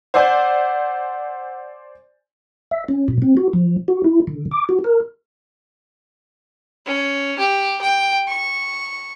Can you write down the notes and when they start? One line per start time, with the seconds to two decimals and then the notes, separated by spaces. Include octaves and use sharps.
0.14 C5 D5 F#5 G#5 E6 G6
2.71 E5
2.88 C#4
3.08 B2
3.22 C4
3.37 F#4
3.53 F3
3.88 F#4
4.04 E4
4.27 D3
4.51 D6
4.69 F#4
4.84 A#4
6.86 C#4
7.39 G4
7.81 G5
8.28 C#6